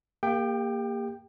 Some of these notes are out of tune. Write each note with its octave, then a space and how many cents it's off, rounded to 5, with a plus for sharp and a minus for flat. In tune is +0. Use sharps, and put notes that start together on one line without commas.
A#3 -10 G4 +35 G5 +0